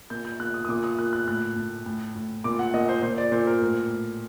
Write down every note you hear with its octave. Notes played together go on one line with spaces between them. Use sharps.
A#2 G6
G6
A#2 F#6
D#6
D#6
A#2 D6
D#6
A#2 F#6
F#6
A2 F#6
A2
A2
A2
A#2 D6
F#5
A#2 D#5
C5
A#2 C5
D5
A#2 C5
A#4
A2 A#4
A2